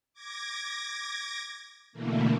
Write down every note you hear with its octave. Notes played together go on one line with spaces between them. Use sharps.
D6 G#6 A#6
B2 D3 E3 A3 A#3